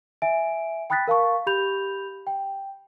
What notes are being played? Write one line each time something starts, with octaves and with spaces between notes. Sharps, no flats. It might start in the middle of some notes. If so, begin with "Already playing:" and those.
E5 G#5 D7
G5 B5 D#6 F#6 A6 B6
A#4 F5 A5 C#6
G4 B5 G6 F7
G5